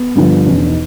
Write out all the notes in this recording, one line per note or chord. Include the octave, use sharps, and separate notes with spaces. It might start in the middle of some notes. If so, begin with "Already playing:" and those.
Already playing: B3
G2 D3 F3
E2 B2 C#4
D4
D#4